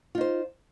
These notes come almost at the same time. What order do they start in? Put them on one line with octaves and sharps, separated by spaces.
F4 D#4 C5